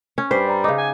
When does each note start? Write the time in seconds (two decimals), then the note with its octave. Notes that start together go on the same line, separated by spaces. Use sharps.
0.18 C#4
0.31 G2 G3 C5 B6
0.47 D5 A#5
0.64 C#3 D#4 D6
0.78 F#5 G#5